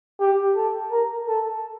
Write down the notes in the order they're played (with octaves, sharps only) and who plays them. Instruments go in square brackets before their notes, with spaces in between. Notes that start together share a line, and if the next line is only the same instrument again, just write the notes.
[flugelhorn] G4
A4
A#4
A4